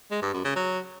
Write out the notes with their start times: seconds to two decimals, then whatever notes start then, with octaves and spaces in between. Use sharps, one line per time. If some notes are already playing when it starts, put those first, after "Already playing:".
0.11 G#3
0.22 G2
0.33 F#2
0.45 C#3
0.56 F#3